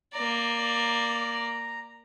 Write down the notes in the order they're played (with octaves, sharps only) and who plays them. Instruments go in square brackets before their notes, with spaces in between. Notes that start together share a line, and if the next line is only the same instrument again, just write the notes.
[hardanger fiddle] A#3 D5 [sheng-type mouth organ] A#5